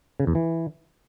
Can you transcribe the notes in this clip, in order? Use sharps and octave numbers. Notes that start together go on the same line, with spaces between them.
C#3
E2
E3